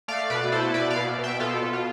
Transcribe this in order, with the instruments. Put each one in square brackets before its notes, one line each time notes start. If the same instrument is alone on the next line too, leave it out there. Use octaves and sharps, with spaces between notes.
[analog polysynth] A3 D5 F5
B2 B4 D5
E4 A4 C5
B2 B4 D5
D5 F5
B2
B2
E5 G5
B2 F4 A4
B2
F4